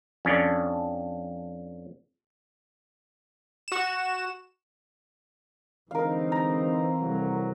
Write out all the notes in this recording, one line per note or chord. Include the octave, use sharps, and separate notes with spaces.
F2 C#4 D4
F#4 E7
D3 E3 G#3 C4 D#4 A#4 F5
A#5
C2 F2 F#3